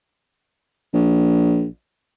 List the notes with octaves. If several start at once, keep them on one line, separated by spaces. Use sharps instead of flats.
A#1